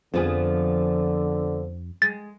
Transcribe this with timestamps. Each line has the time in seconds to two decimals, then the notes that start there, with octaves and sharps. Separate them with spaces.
0.14 F2 D3 F3 B3 G#4
2.02 G#3 A6